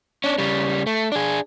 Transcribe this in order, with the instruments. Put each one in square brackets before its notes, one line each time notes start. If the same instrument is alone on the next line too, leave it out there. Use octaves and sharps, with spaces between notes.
[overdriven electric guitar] C#4 D4
C#3 G3
A3
D4 G#4